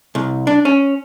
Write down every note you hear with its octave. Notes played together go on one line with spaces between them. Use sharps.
C2
D4
C#4